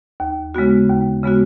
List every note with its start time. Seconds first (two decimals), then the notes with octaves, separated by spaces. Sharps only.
0.20 D#2
0.55 C#3 G#3 B3 F#4
0.89 D#2
1.23 C#3 G#3 B3 F#4